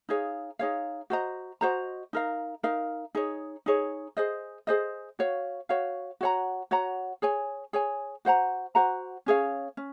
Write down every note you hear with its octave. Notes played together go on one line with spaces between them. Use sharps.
D#4 G#4 C#5 F5
D#4 G#4 C#5 F5
F#4 C5 D#5 A#5
F#4 C5 D#5 A#5
D#4 A#4 F5
D#4 A#4 F5
D#4 G#4 C#5
D#4 G#4 C#5
G#4 C5 D#5
G#4 C5 D#5
F#4 C#5 F5
F#4 C#5 F5
F#4 C#5 F#5 A#5
F#4 C#5 F#5 A#5
G#4 C#5 G#5
G#4 C#5 G#5
F#4 C5 F#5 A#5
F#4 C5 F#5 A#5
C#4 G#4 C#5 F5
C#4